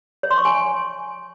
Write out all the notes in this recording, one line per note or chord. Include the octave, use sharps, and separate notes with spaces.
C#5
C6
C#6
G#5